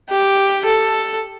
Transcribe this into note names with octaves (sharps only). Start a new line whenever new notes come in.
G4
A4